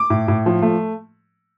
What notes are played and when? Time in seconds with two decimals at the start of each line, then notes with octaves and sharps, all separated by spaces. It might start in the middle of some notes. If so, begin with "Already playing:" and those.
Already playing: D6
0.10 A2
0.28 A2
0.46 F3
0.62 A3